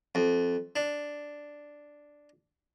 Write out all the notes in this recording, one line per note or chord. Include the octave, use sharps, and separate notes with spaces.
F2
D4